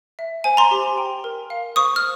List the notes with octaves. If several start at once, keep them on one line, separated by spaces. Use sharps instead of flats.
E5
C5 G#5
A#5 C6
G4
G5
A#4
F5
C5 C#6 D#6
F6